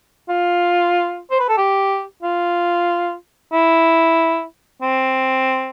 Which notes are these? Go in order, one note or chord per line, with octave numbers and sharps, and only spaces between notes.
F4
C5
B4
A4
G4
F4
E4
C4